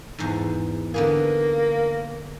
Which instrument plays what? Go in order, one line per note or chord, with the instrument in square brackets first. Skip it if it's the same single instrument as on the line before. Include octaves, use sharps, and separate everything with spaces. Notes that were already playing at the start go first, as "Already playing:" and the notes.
[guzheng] E2 G#2
[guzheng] D3 B3 G#4 [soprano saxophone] A#3